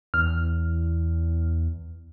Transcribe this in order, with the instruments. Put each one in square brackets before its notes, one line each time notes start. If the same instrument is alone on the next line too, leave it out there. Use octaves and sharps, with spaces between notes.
[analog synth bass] E2 [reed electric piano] F6